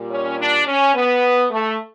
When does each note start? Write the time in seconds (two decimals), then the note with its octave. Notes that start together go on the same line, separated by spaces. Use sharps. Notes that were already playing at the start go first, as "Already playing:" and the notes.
Already playing: A#2 G3
0.10 C#4
0.39 D4
0.67 C#4
0.95 B3
1.51 A3